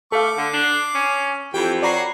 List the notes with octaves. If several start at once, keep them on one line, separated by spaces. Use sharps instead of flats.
A3 A4 F5 D6
D3
D4 C7
C#4
F2 E3 G4 G5
F#4 B4 C#5 D5 A#5 C7